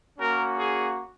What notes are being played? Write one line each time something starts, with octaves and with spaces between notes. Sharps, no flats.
A#3 C#4 F#4 A#4
G#4